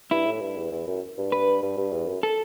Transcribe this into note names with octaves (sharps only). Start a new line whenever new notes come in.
G2 E4
A2
G2
E2
E2
F#2
G2
B4
G2
G2
E2
F#2
A4